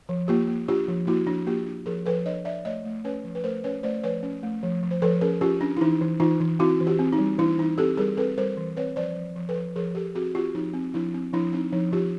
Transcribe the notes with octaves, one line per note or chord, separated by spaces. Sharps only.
F3
A#3 F4 G4
A#3
D4 F4 G4
F3
A#3 E4 F#4
F3 D4
A#3 F4 G4
D4
F3 G#4 A#4
F3 A4 B4
D4 C#5 D#5
D4 D5 E5
A3 C#5 D#5
A3
C#4 B4 C#5
F3
B4
A3 A#4 C5
C#4 B4 C#5
A3 C5 D5
F3 B4 C#5
C#4
A3
F3
F3
C5
F3 A4 B4
C#4 G#4 A#4
C#4 F4 G4
C#4 D4
E4
E3 D#4
E3
E3 D#4 F4
E3
C4 E4 F#4
E3
F4 G4
C4
D#4
G3
E3 D4 E4
E3 D#4
C4 G4 A4
G3 G#4 A#4
C4 A4 B4
G3 A#4 C5
E3
C4 B4 C#5
F3 C5 D5
F3
F3
A4 B4
F3
F3 G#4 A#4
F3 G4 A4
C4 F#4 G#4
C4 F4 G4
F3 D#4
C4
F3 D4 E4
C4
F3 D4 E4
C4 D#4
F3 D#4
F3 F4 G4